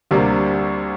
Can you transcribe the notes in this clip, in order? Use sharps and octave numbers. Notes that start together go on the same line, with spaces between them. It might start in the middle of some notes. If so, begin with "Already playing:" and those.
D2 C3 G3 A#3 D4